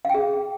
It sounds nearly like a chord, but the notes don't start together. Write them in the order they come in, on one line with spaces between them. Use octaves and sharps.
F5 G5 G#4